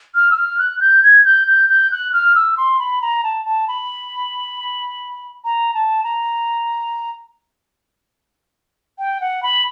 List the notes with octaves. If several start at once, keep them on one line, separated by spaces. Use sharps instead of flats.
F6
E6
F6
F#6
G6
G#6
G6
G6
G6
F#6
F6
E6
C6
B5
A#5
A5
A5
B5
A#5
A5
A#5
G5
F#5
B5